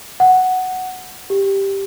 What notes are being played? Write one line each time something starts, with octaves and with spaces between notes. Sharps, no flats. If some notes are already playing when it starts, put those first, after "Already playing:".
F#5
G4